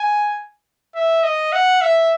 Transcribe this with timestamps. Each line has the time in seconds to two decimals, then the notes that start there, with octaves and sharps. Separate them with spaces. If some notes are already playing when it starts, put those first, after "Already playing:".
Already playing: G#5
0.95 E5
1.23 D#5
1.52 F#5
1.81 E5